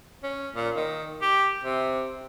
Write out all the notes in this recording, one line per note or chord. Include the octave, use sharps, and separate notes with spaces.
C#4
A#2
D#3
G4
C3